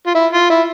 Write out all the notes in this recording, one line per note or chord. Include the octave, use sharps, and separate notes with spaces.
F4
E4
F4
E4